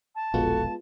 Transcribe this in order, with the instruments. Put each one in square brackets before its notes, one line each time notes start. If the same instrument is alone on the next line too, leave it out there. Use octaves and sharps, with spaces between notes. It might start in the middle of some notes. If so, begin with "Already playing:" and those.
[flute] A5
[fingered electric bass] E1 A#1 [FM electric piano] G#3 B3 F4 [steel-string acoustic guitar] F#4 A4